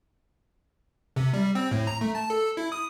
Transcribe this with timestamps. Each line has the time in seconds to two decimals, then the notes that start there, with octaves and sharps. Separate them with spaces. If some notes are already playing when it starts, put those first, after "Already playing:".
1.16 C3
1.33 G3
1.55 C4
1.71 A2
1.87 A#5
2.01 A3
2.15 A5
2.30 A4
2.57 E4
2.72 D#6